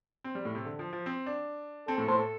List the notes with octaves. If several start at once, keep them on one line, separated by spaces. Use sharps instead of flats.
C4
G3
A2
C3
D3
F3
F3
C4
D4
C4 A4
A2 A4
A2 C5
A4